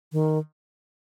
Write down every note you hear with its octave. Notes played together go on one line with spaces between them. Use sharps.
D#3